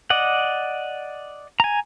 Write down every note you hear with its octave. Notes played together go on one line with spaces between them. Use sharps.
D5 D#5 F#5
G#5 A#5